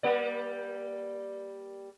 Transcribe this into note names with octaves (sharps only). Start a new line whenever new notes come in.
G3 A#3 D5